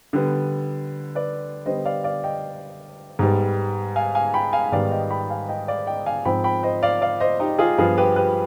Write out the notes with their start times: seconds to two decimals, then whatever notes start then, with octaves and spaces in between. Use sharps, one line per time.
0.13 D3 G3 B3
1.15 B4 D5
1.66 D3 G3 B3 C5 D#5
1.85 D5 F5
2.04 D5 F5
2.24 D#5 G5
3.19 G#2 G3 B3
3.96 F5 G#5
4.15 F5 G#5
4.34 G5 B5
4.53 F5 G#5
4.72 G#2 D#3 G3 B3 D5 F5
4.91 D#5 G5
5.10 G5 B5
5.30 F5 G#5
5.49 D#5 G5
5.68 D5 F5
5.87 D#5 G5
6.06 F5 G#5
6.25 G#2 F3 C4 G5 B5
6.44 G5 B5
6.63 C5 D#5
6.83 D5 F5
7.02 D5 F5
7.20 C5 D#5
7.40 D#4 G4
7.59 F4 G#4
7.78 G2 F3 B3 F4 G#4
7.98 G4 B4
8.16 G4 B4